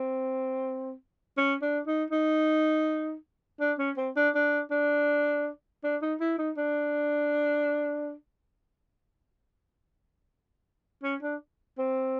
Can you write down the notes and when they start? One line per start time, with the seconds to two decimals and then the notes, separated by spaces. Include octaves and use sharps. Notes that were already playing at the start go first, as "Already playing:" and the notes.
Already playing: C4
1.37 C#4
1.62 D4
1.87 D#4
2.11 D#4
3.60 D4
3.78 C#4
3.97 C4
4.16 D4
4.35 D4
4.71 D4
5.84 D4
6.02 D#4
6.20 E4
6.38 D#4
6.57 D4
11.03 C#4
11.22 D4
11.78 C4